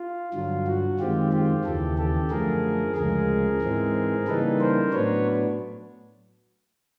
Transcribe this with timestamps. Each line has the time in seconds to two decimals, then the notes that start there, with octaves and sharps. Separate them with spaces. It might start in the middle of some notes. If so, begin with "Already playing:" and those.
Already playing: F4
0.33 G2 D3 F#3 F4
0.67 F#4
0.99 F#2 D#3 G#3 C4 F4 G4
1.32 F4 G4
1.65 D#2 C#3 E3 G4 A4
1.98 G4 A4
2.30 F#2 D3 F3 A3 G#4 A#4
2.96 D2 C#3 F3 G#3 G#4 A#4
3.62 G#2 E3 G#3 C4
4.27 C#3 E3 G3 A#3 D#4 A4 B4
4.60 A#4 C5
4.92 A2 F#3 B3 D4 B4 C#5